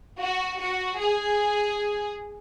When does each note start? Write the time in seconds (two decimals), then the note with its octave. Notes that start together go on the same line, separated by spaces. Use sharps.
0.20 F#4
0.60 F#4
0.99 G#4